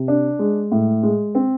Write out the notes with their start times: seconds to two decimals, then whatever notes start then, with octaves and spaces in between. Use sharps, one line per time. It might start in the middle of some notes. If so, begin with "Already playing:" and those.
Already playing: C3
0.08 D4
0.39 G#3
0.72 A2
1.03 G#3
1.35 C4